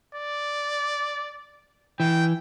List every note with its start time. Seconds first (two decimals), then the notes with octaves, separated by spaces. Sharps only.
0.15 D5
2.00 E3 G5